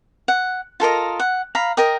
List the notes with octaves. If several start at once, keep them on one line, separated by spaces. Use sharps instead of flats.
F#5
F4 A4 A#4 D#5
F#5
F5 A#5 B5
A#4 D#5 G5 D#6